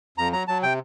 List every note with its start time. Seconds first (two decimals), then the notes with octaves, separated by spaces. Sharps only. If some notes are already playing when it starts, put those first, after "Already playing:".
0.18 F2 A#5
0.33 F#3 A#5
0.48 F#3 A5
0.63 C3 G5